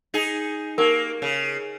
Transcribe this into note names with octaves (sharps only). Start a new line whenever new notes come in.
D#4 G#4
A#3 D#4 G4 A#4
C#3